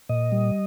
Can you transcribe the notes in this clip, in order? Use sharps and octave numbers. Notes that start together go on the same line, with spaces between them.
A#2 D#5
G3